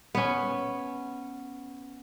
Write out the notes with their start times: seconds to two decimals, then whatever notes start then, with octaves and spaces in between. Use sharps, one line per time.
0.15 B3 C#4